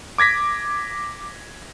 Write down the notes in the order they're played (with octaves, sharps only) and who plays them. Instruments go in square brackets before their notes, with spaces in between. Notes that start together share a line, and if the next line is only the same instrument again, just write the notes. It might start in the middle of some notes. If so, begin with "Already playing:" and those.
[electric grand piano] D6 G#6 A#6 B6